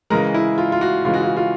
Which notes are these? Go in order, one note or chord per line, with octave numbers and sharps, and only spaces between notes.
C#3 E3 G#3 A#4
E4
F4
F4
F#4
C#3 E3 G#3 F4
F#4
F4
F4